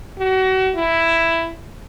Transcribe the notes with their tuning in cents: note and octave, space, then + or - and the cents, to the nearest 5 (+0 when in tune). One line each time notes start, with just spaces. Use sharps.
F#4 +35
E4 +5